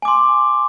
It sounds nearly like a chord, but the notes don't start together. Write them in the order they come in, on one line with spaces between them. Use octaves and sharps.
G#5 D6 C6